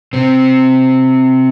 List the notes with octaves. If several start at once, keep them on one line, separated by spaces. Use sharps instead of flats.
C3 C4